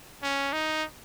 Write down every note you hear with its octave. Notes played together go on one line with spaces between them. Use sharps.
C#4
D#4